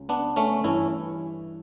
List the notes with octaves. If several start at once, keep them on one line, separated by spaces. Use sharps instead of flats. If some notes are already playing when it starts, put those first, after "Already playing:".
Already playing: C#2 C#3
B3 D4
A3 C#4
G2 E3 C#4 E4